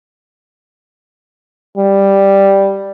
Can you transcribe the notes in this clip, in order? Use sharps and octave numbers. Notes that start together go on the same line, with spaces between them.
G3